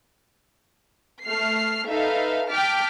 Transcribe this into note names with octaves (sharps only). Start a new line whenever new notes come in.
A3 F6 C7
D#4 A4 B4 E5 F5
G5 A5 D6 F6 B6